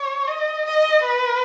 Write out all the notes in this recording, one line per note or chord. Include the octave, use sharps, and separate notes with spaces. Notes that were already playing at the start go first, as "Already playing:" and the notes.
Already playing: C#5
D#5
D#5
B4